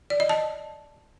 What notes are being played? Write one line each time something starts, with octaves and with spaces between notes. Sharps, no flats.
D5
D#5
A5